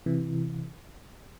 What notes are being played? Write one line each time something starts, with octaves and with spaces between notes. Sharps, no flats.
C3 E3